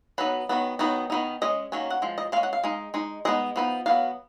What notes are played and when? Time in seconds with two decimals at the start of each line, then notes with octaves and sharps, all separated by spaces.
0.18 F#3 B3 D#4 B4
0.49 D#3 F#3 B3
0.79 D#3 F#3 B3 D#4
1.10 D#3 F#3 B3 D#4
1.42 G#3 C#4 D#5
1.72 D#3 F#3 A#3 C#4
1.90 F#5
2.02 F3 G#3
2.18 D#5
2.32 G#3 F5
2.37 C#4
2.43 F#5
2.53 F5
2.64 G#3 D#4
2.94 G#3 D#4
3.25 G#3 B3 D#4 D#5
3.56 F3 B3 D#4
3.86 F#3 B3 D#4 F5